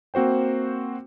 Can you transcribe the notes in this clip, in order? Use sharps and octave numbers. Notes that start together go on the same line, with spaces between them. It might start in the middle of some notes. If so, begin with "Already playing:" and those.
A#3 C4 F#4 C5 G5